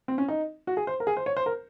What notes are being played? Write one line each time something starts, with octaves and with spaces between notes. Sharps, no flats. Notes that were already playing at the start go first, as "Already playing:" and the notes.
C4
C#4
D#4
F#4
G#4
C5
A#4
G#4
C5
C#5
C5
A#4